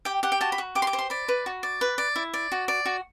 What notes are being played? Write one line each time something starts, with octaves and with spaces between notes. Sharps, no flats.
G4 G5
G4 F#5
G5
F#4 A5
B5
F#4
G4 D6
C6
D6
C5
C6
D5 B5
B4
F#4
D5
B4
D5
E4
D5
F#4
D5
F#4